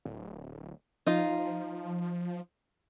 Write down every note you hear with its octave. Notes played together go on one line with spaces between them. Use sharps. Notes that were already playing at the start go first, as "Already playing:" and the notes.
D1
F3 D#4 F4